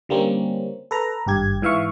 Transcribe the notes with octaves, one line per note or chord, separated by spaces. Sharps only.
D3 G3 A#3 C4 C#4
A4 B4 A#5
G#1 G2 G4 G#6
G#2 E3 E5 F5 C#6